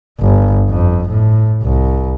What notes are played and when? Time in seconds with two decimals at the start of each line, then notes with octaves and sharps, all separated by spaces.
0.20 G1
0.69 F2
1.09 A2
1.62 C2